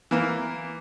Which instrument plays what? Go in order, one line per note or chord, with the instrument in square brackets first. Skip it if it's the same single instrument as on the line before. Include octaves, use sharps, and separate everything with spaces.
[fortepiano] E3 A#3